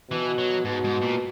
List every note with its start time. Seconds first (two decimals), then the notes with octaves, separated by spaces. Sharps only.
0.10 B2 E3
0.38 F#3
0.65 G#2 B2
0.84 G#2
1.02 A#2